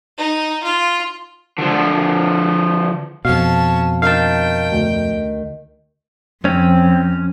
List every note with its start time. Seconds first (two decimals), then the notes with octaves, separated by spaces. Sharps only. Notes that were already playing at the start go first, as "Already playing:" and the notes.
0.18 D#4
0.63 F4
1.58 D3 F3
3.25 F2 B2 C#4 F5 A5
4.02 D#3 F5 G5 A5
4.72 D2
6.45 F2 C4 C#4